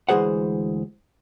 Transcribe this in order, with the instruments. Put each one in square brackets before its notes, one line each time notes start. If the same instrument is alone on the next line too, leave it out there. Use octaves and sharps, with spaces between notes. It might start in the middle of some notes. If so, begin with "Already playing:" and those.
[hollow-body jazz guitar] D2 E3 G#3 G#4 C5 F#5